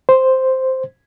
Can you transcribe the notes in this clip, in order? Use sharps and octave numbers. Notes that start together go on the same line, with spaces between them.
C5